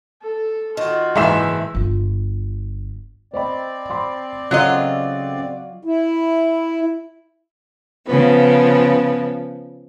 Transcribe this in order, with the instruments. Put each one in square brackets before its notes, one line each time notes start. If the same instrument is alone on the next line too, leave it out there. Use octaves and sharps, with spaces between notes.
[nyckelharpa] A4
[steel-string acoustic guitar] D#3 [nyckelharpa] F4 F#4
[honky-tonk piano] F#1 E5 E7 [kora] G#2 E3 C5
[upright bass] G1 F4
[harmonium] C4 D5 [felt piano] C5 D#5 B5
[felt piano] B5 C6 D6
[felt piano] C#3 A4 F#5 [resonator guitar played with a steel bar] F#3 F4 D#5
[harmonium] E4
[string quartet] C#3 F3 B3